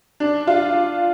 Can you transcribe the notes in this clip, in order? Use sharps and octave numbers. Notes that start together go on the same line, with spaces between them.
D4
F4